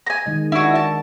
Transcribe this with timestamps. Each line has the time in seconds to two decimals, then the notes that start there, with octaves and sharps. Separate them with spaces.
0.07 G#5 A#5
0.26 D#3 G#3 D#5
0.52 D4 E4 F#4
0.75 A5